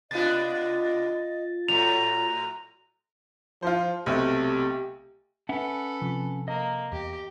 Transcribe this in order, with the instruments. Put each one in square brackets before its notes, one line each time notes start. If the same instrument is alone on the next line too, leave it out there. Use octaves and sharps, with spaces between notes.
[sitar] B2 B3 D4 [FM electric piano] F4 A6 [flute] D#5
[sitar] A2 F#3 A3 [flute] A#5 [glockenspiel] F7
[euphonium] F3 [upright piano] F4 C5
[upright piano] B1 C3 A3 [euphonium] G4
[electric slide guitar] C#4 E5 F#5 [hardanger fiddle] A4 B4
[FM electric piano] C3 F3
[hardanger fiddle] A#3 [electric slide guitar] D#5
[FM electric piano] E2 [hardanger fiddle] G4